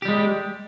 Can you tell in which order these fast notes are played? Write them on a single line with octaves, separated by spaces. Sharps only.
G4 G3 G#3